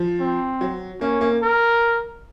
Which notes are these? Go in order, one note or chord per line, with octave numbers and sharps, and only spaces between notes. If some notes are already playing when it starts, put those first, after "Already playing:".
Already playing: F3
C4
F#3
A#3 C#4
A#3
A#4